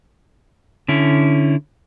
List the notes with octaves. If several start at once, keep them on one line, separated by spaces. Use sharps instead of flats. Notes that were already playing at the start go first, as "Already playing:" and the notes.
D3 C#4 E4